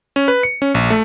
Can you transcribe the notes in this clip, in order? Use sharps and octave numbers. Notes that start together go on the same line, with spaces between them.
C#4
B4
C#7
C#4
A#1
A3